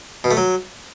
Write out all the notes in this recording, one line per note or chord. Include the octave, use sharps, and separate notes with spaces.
B2
A3
F#3